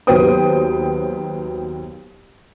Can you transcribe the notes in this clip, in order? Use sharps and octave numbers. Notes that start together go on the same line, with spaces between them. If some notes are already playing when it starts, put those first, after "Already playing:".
D#2 F#3 B3 C5 G5 D#6